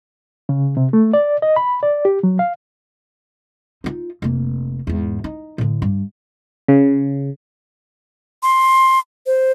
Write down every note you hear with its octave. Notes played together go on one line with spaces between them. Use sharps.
C#3
C3
A3
D5
D#5
B5
D5
G4
F#3
F5
D#4 F4
F1 A#3
E2 G#2
D#4
A2 D3
G2
C#3
C6
C5